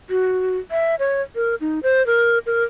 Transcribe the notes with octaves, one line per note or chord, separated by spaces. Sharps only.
F#4
E5
C#5
A#4
D#4
C5
A#4
A#4